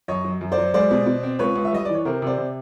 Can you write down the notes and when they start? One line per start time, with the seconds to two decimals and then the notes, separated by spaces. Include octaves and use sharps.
0.08 F#2 C#5 D#5
0.24 F#3
0.41 F#2
0.52 C5 D5
0.58 F#3
0.74 G#3 C5 D5
0.91 B2
1.06 B2
1.23 C4
1.39 C#2 B4 C#5
1.55 C#2
1.65 E5
1.72 G3 D#5
1.85 E3 D5
1.95 C#5
2.05 C3 A#4 C5
2.22 C3 C5 D5
2.38 C3